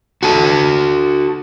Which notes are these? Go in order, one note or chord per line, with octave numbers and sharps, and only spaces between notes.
F#4 A4